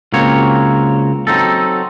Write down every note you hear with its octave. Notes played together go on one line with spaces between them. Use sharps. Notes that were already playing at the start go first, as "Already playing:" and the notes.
C#2 A#3 C4 F#4 C#5
F#3 C4 D#4 A4